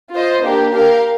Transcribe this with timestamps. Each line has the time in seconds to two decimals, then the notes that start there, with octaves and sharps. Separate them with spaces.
0.12 F4 C5 D#5
0.42 A#3 D4 G4 A#4
0.72 G4 A#4 F5